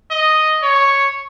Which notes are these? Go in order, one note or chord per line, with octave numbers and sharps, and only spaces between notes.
D#5
C#5